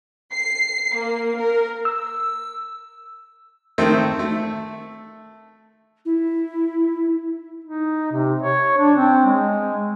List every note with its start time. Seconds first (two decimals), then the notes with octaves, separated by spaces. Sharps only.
0.33 C7
0.95 A#3
1.38 A#4
1.85 E6
3.78 D#3 A3 C4
4.19 A3
6.05 E4
7.65 D#4
8.12 C3
8.42 C#5
8.78 D4
8.97 C4
9.25 G#3